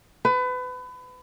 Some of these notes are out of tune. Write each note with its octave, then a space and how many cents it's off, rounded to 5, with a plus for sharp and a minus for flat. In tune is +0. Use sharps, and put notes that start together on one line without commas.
B4 +30